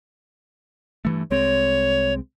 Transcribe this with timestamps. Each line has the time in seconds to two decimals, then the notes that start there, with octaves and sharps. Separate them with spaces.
1.05 G2 E3 A3
1.31 C2 G#3 C4 C#5